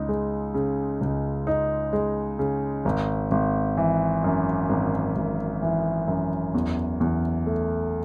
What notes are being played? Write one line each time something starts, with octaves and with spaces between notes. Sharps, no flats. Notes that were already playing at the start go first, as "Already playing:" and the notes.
Already playing: C#2 D#4
G#3
C#3
C#2
D#4
G#3
C#3
G#1
G#1
E3
F#2
G#1
G#1
E3
F#2
E2
E2
A3